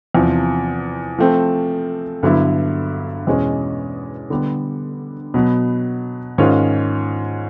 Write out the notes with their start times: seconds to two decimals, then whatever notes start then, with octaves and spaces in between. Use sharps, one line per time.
0.15 E2 C3 F3
1.18 F3 A3 C4
2.23 G2 D3 F#3 B3 E4
3.27 E2 B2 G#3 C#4
4.30 D3 G3 B3
5.34 B2 F#3 B3
6.38 G#2 D#3 G#3 C#4 F4